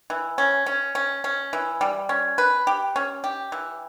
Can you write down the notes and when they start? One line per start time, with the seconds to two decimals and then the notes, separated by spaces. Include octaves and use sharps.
0.10 E3
0.38 C#4
0.66 C#4
0.95 C#4
1.24 C#4
1.53 E3
1.81 G3
2.09 C#4
2.38 B4
2.67 G4
2.96 C#4
3.24 G4
3.52 E3